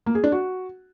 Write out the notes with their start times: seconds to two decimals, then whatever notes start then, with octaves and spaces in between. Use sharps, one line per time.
0.06 A#3
0.15 G#4
0.24 D4
0.32 F#4